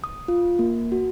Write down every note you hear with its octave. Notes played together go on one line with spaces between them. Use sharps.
D#6
F4
A#3
F#4